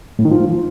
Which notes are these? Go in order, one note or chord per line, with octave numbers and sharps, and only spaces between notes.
A2
D#3
F3